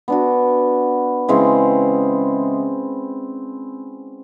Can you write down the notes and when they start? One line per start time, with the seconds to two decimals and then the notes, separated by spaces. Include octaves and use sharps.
0.08 B3 D4 F#4
1.28 C#3 E3 G#3 C4